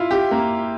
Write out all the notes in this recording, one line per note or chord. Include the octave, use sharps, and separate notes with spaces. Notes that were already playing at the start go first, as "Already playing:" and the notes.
Already playing: E4 F4
G4
A#3